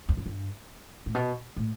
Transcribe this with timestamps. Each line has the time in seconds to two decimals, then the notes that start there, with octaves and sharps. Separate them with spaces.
0.09 E2
0.17 F#2
0.26 G2
1.06 A2
1.15 B2
1.56 A2